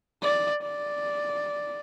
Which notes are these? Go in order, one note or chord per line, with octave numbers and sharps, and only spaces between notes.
D5
D5